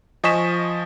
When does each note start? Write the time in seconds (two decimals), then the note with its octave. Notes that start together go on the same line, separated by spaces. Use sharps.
0.24 F3 D#5 G#5 C#6 B6 E7